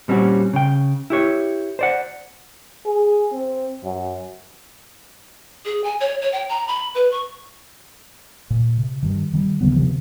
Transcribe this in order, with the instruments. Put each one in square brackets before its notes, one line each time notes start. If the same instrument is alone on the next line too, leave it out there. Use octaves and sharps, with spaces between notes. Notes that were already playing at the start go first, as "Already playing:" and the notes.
[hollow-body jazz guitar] A#2 G3 C4 C#4 F#4
C#3 G5
E4 G4 C#5
C5 D5 F#5
[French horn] G#4
C4
F#2
[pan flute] G#4
G#5
C#5
C#5
G5
A#5
B5
B4
C#6
[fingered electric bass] A#2
C3
G2 D#3
D#3 F#3 G3
D2 C#3 F#3 B3
C3 D#3 F3